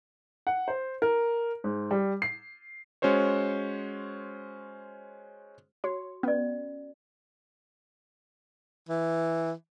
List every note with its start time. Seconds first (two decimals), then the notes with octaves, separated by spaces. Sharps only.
0.47 F#5
0.68 C5
1.02 A#4
1.64 G#2
1.91 G3
2.22 C7
3.02 G#3 C#4 F#4 C5 C#5
5.84 F#4 C#5
6.23 B3 C#4 D5
8.89 E3